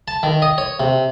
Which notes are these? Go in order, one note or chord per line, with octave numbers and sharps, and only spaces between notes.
A5
D#3
D#5
C#5
C3